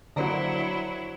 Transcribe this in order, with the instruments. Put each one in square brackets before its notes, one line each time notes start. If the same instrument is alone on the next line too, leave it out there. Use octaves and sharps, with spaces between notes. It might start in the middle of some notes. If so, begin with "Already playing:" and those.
[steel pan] D3 A#3 F#4 [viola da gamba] F#3 E4 [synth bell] C5 D5 A#5